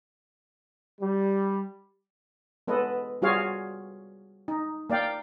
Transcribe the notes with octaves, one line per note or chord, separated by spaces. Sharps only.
G3
G#3 B3 A4 B4 D#5
G3 F4 F#4 G#4 C#5 F5
D#4
A#3 D5 F5 G5